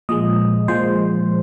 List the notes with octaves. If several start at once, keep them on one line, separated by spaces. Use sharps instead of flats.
A#2 F3 G#3 D#5
A#2 F3 G#3 C5